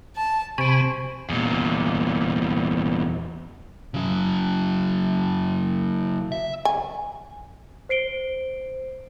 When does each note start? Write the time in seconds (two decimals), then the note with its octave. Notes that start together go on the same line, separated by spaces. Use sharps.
0.16 A5
0.58 C3 C5 G#5 B5 C#6 D7
1.30 E2 A#2
3.94 C#3 F#3
6.32 E5
6.65 G#5
7.89 C5 C7 D7 G7